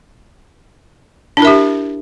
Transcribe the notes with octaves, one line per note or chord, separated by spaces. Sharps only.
D4 E4 G4 A#4 E5